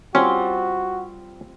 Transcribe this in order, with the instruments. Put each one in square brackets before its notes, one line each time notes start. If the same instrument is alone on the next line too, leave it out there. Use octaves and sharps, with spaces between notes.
[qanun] G3 C4 F4 [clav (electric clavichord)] C#4 [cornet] F#4